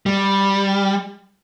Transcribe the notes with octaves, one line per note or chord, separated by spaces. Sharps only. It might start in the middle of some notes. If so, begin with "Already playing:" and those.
G3